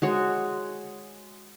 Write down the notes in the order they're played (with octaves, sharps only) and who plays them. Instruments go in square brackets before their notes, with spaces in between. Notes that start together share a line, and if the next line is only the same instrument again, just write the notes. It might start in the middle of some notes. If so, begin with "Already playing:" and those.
[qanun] G#3 F#4 C#5